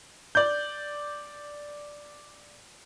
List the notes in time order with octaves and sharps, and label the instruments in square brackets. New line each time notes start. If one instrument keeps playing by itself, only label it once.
[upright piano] D5 G6